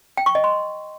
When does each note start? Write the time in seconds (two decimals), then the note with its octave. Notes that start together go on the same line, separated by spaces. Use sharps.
0.17 G5
0.26 C#6
0.35 D#5
0.44 C6